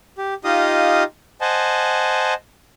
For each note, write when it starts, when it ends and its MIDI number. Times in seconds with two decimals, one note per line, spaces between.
0.18 0.34 67
0.44 1.04 63
0.44 1.04 65
0.44 1.04 67
0.44 1.04 75
0.44 1.04 77
0.44 1.04 87
1.41 2.34 72
1.41 2.34 75
1.41 2.34 78
1.41 2.34 80
1.41 2.34 81